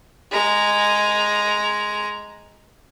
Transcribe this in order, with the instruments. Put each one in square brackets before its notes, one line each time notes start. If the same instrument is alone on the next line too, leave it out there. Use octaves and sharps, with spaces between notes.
[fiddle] G#3 A#5